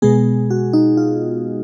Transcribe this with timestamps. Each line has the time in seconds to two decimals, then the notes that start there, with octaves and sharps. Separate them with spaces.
0.02 B2 G#3 B3 G#4
0.50 F#4
0.73 D#4
0.97 F4